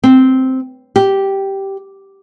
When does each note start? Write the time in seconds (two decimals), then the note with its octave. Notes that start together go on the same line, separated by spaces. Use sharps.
0.04 C4
0.96 G4